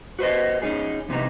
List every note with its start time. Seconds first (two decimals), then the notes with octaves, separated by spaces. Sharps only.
0.19 F#4 B4 C5 D#5
0.62 C#4 D#4 G#4
1.09 E2 C3 E3 D#4